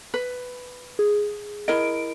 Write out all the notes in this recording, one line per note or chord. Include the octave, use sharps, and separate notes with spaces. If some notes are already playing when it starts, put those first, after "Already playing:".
B4
G#4
E4 A#4 D#5 D7